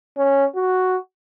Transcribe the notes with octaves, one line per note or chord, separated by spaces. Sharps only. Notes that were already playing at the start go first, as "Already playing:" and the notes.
C#4
F#4